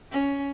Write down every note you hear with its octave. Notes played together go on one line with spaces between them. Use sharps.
C#4